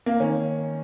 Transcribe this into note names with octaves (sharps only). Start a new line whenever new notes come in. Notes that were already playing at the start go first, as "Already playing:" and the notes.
A#3
D#3 C#4